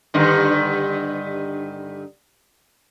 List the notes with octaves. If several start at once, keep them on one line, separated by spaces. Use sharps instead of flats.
G2 D3 D#3